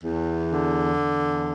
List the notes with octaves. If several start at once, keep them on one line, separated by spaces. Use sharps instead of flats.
E2
D3
E2